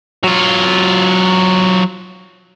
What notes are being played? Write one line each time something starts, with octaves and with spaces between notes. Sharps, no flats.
F#3 F4